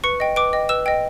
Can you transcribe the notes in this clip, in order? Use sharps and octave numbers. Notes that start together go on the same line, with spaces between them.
B4 C#6 C#7
D#5 G5
B4 D6 D7
D#5 G5
B4 E6 E7
D#5 G5